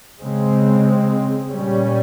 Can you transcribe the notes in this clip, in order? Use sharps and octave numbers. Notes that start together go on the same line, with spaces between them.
C#3 G#3 C4
A#2 G3 C#4